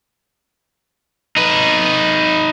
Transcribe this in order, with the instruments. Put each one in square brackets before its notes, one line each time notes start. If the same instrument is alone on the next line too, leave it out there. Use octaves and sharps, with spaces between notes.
[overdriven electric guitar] D#4 B4